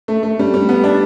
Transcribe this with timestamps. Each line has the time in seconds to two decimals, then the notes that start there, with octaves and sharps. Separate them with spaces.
0.08 A3
0.23 A3
0.39 G3
0.54 G3
0.69 B3
0.84 D4